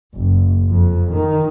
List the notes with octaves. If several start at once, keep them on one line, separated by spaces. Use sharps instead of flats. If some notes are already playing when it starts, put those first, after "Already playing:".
F#1
F2
D#3